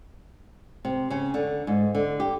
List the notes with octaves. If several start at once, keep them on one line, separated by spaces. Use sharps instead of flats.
C3
C#3
D3
G#2
D3
G4